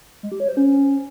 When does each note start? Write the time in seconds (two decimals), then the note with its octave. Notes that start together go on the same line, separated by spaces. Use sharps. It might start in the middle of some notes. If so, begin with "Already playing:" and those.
0.23 G#3
0.32 G4
0.40 C#5
0.48 C5
0.57 C#4